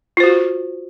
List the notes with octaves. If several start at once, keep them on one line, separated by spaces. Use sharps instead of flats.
F4 F#4 C5